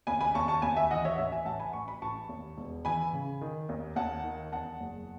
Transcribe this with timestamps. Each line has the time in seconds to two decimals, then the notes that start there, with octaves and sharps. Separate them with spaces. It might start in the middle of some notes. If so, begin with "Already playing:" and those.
0.07 D#2 G#5 B5
0.21 G#5 B5
0.35 D#2 A5 C#6
0.48 A5 C#6
0.62 D#2 G#5 B5
0.76 E5 G#5
0.91 E3 D#5 F#5
1.05 C#5 E5
1.18 A1 C#5 E5
1.32 E5 G#5
1.46 A1 F#5 A5
1.59 G#5 B5
1.73 A1 C#6
1.88 B5
2.02 A1 A5 C#6
2.29 D#2
2.57 E1
2.85 E3 G#5 B5
3.13 C#3
3.41 D#3
3.69 D#2
3.96 D#2 F#5 A5
4.24 D#3
4.52 E2 F#5 A5
4.80 F#1